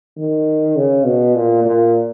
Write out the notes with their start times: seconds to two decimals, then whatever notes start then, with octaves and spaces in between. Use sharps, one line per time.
0.17 D#3
0.76 C#3
1.05 B2
1.35 A#2
1.65 A#2